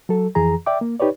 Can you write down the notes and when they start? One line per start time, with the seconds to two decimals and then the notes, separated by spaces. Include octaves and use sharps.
0.09 F#3 A4
0.35 F2 E3 G#4 A#5
0.66 D5 E5 G5 D6
0.81 A#3
1.00 D#4 G4 B4 C#5 D5